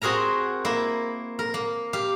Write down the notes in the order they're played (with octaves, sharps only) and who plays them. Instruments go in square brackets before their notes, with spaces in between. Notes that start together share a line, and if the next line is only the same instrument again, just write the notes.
[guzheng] C4 F#4 G#4 A#4 A#5
A#3 E4
A#4
A#3
G4 F5